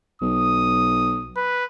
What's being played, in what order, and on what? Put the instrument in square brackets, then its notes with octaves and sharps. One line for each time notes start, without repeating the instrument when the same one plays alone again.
[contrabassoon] B1 [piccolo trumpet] D#6
[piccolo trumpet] B4